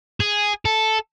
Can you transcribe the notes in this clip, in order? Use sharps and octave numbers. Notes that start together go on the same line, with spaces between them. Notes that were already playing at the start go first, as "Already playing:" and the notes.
G#4
A4